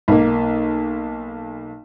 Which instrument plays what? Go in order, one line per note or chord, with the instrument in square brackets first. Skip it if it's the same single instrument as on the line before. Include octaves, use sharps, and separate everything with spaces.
[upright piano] B1 A#3